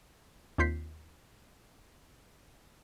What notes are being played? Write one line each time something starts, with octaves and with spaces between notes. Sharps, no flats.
D#2 C4 F4 G6 B6 C7